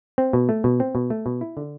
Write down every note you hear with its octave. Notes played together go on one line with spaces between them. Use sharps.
C4
B2
A3
B2
C4
B2
A3
B2
E4
D3